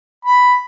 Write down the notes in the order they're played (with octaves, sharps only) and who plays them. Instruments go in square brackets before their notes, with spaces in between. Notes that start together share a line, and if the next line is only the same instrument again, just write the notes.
[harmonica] B5